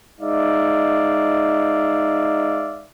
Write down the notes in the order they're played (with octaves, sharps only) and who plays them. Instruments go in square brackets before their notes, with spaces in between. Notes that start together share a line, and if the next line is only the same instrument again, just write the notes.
[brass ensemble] G#3 D#4 D5 E5 F5